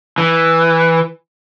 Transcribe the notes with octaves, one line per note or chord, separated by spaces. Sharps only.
E3